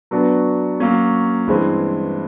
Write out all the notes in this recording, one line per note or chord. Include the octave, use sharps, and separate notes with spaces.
F#3 B3 D4 F#4
F#3 A#3 C#4
G2 E3 G#3 C4